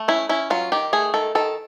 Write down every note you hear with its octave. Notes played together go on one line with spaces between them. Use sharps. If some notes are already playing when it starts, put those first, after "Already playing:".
Already playing: A3
C#4 E4
C#4 E4
F#3 F4
D#3 G4
A3 G#4
D#3 A4
D#3 A4